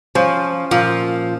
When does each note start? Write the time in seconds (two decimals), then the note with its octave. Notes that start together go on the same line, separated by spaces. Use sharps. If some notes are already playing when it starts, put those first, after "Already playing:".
0.15 F3 C#4 C5
0.71 A#2 F3